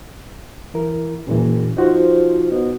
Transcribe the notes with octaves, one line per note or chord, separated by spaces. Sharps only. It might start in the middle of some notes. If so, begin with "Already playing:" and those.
E3 E4 A#4
F#1 D#2 A#2 E3
F3 D#4 F#4 C5
B2